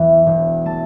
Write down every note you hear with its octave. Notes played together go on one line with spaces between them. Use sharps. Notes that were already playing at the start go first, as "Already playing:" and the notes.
Already playing: E2 E3
E1
A3 A5